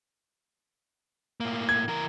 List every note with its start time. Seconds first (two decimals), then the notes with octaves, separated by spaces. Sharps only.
1.40 A2 A#3
1.69 G#6
1.88 E3 A#4